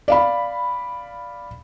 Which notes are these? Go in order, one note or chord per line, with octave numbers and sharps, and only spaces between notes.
D5 F5 B5